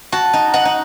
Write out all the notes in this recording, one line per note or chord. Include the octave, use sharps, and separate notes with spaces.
F#4 A5
D#4
D#4 F#5
D#4